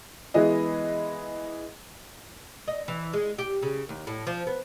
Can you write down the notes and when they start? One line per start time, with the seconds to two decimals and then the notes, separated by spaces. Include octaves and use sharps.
0.34 E3 G#3 B3 E4 G#4 D#5
2.68 D#5
2.88 E3
3.13 G#3
3.38 G4
3.62 C#3
3.89 D#2
4.07 A2
4.27 F3
4.47 B3